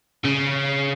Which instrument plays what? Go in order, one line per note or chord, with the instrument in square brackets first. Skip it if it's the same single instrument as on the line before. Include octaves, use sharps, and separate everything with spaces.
[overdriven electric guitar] C#3